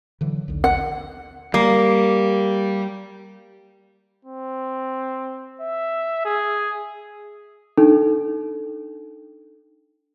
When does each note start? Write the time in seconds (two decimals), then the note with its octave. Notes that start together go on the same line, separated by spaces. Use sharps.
0.21 D3 E3 F#3
0.48 A#1 D#2 D3
0.64 F#5
1.54 G3 A#3
4.25 C4
5.60 E5
6.25 G#4
7.78 D4 D#4 A4